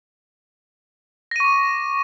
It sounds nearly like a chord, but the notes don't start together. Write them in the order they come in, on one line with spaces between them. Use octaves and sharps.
A#6 D#7 C#6 D6